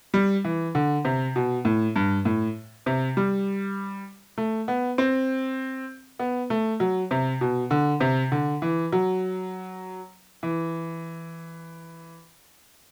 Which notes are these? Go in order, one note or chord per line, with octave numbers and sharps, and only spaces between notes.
G3
E3
D3
C3
B2
A2
G2
A2
C3
G3
A3
B3
C4
B3
A3
F#3
C3
B2
D3
C3
D3
E3
F#3
E3